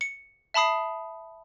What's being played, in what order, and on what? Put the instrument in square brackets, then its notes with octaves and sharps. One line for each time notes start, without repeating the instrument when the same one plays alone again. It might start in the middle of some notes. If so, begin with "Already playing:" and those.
[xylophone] C#7
E5 A5 B5 D#6 C7